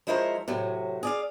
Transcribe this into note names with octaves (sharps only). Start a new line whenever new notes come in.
F3 G#3 E4 A#4 C5 C#5
A2 C3 F#3
G#4 D5 F5